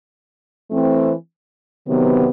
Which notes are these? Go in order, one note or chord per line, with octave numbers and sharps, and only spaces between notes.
E3 A3 C4
C3 D#3 F#3 B3